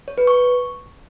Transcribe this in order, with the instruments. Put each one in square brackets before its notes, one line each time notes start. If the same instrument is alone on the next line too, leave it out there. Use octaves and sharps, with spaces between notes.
[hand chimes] C#5
B4
C#6